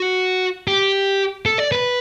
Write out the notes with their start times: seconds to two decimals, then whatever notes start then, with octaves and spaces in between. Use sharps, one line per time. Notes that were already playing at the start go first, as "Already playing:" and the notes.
Already playing: F#4
0.68 G4
1.46 A4
1.58 D5
1.72 B4